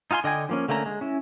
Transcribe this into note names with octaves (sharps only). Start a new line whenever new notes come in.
D#4 F4 F5 G#5 C6
D3 D#5 G5 G#5
F3 A#3 C#4
D3 A3 A#3 C#4 A#5
G#3
C#4 E4